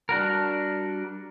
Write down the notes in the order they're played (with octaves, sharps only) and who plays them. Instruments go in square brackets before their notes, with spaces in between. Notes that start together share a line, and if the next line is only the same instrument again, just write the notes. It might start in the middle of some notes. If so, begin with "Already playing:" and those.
[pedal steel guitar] G3 D4 F#4 A#4